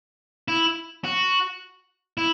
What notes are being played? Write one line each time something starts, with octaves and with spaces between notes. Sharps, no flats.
E4
F#4
E4